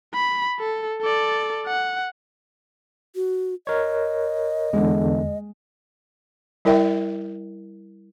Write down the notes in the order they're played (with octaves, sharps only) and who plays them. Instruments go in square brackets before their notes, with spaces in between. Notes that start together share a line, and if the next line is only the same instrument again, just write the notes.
[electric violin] B5
A4
A4 D5
F#5
[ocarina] F#4
[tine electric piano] A#4 C#5 [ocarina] D#5
[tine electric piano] E2 D3 [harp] G#3
[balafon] G3 E4 A#4 D5 E5 G5